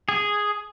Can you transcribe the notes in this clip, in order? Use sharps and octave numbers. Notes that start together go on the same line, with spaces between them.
G#4